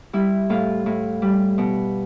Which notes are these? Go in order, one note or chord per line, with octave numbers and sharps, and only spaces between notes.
G3 E4
A2 F4
A2
G3
B2